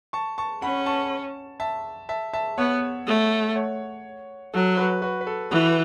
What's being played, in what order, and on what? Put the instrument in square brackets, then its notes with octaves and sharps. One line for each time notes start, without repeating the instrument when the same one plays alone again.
[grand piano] A5 C#6
A5 C#6
[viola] C#4 [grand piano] F#5 B5
[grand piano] A5 C#6
E5 A5
E5 A5
E5 A5
[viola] B3 [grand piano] C#5 F#5
[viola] A3
[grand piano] C#5 F#5
[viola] F#3 [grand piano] A4
[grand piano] F#4 B4
F#4 B4
B4
A4
[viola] E3 [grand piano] F#4 B4